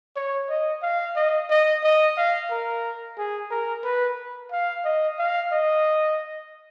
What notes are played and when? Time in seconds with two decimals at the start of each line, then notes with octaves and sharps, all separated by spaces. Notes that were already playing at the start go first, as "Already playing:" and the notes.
0.16 C#5
0.49 D#5
0.82 F5
1.16 D#5
1.50 D#5
1.84 D#5
2.17 F5
2.50 A#4
3.18 G#4
3.51 A#4
3.84 B4
4.52 F5
4.84 D#5
5.18 F5
5.52 D#5